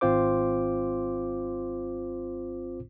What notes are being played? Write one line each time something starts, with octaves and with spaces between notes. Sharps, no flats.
G#1 C4 F4 C5 D6